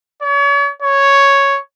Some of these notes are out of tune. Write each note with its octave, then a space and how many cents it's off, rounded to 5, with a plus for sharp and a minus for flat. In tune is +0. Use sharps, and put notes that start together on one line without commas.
C#5 +40
C#5 +0